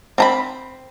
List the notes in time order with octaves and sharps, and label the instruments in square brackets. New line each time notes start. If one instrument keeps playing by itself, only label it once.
[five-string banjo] C4 A#5 B5